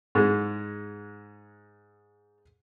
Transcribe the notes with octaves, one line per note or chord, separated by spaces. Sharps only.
G#2 G#3